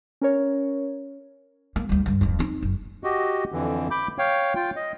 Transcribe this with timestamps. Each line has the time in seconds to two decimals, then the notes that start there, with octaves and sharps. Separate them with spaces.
0.21 C#4 A#4 C#5
1.76 A#3
1.89 D2 G3
2.06 G2 D3
2.21 D1 F2
2.39 C4 D#4
2.63 F#1
3.04 F#4 G4 D#5
3.52 F2 D3 E3
3.91 B5 D6 G6
4.18 C#5 F5 G5
4.56 F4 G5
4.76 D#5